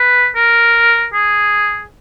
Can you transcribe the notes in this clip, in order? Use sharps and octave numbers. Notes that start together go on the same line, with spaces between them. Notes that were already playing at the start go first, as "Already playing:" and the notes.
Already playing: B4
A#4
G#4